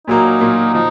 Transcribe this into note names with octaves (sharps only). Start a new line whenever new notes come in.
A#2 F#3 A#3 D#4
A#2 F#3 A#3
F3 D#4